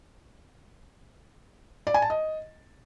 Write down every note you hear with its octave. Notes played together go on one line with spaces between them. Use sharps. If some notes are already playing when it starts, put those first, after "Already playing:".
D5
G#5
A5
D#5